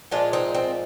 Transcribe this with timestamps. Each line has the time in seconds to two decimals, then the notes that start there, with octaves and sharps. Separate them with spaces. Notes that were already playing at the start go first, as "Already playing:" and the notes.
0.11 A#2 F3 G#3 D4 F4
0.33 C4 D#4
0.54 C4